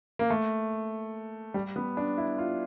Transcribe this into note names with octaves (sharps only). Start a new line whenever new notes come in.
A#3
A3
G3
B3
D4
E4
F4